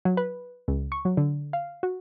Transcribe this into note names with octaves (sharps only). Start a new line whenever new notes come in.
F#3
B4
C#2
C#6
F#3
D3
F5
F#4